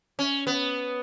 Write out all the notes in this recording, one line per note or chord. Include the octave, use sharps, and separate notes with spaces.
C#4
B3